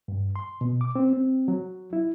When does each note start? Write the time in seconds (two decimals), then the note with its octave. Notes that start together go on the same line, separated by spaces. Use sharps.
0.08 G2
0.36 C6
0.61 B2
0.81 D6
0.95 C4
1.13 C4
1.48 F#3
1.93 E4